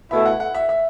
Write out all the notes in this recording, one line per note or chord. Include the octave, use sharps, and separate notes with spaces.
B2 A3 E4 E5
F#5
F#5
E5
E5